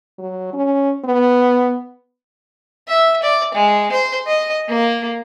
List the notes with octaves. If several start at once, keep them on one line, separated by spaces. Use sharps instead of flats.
F#3
C#4
B3
E5
D5
G#3
C5
D#5
A#3